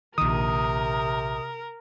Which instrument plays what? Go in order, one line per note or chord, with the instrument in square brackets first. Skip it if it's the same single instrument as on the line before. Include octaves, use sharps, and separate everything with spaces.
[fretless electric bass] A#1 D#3 [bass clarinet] C3 [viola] A#4 [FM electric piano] D#6